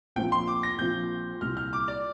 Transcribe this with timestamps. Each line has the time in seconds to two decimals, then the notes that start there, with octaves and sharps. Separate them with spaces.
0.16 A#1 A#2 F3 C4 F4 G5
0.32 C6
0.47 D6
0.63 A#6
0.79 A#1 A#2 F3 C4 F4 G6
1.41 C2 A#2 G3 F6
1.57 F6
1.73 D6
1.88 D5